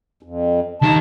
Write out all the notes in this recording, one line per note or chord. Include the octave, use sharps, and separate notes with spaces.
F2
D#2 D#4 A5